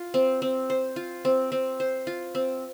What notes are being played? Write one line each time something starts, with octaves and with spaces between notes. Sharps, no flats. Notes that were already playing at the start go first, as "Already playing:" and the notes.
Already playing: F4
C4
C4
C5
F4
C4
C4
C5
F4
C4